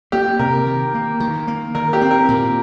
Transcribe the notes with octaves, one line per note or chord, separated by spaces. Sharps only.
A#3 G4
C3 A#4
D#3
A#3
D#3
A#3
D#3 A#4
G4
C4
A#4
A#2